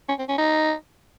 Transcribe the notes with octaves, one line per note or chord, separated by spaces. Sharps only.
C#4
C4
C#4
D#4